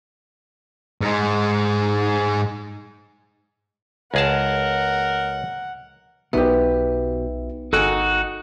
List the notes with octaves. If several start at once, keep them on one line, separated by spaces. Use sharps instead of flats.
G#2 G#3
C#2 G#4 A#4 F#5 A5
B1 B2 B3 D#4 G4 E5
G1 D#4 F#4 A4 G5 G#5